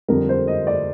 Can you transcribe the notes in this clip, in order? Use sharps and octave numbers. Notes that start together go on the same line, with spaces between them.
F2 D3 G3 A#4
C5
D#5
D5